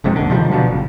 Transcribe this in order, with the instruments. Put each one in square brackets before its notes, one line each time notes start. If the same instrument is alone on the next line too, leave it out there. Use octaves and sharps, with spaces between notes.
[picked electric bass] E1 F2 G#2 C3
D#2 D3
C3 D#3 F3 G3
B2 D3 F3 F#3
F#1